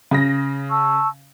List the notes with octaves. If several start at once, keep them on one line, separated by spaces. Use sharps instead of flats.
C#3 A#6
A5 C#6 E6